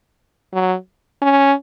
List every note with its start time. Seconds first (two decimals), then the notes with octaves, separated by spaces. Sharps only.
0.53 F#3
1.22 C#4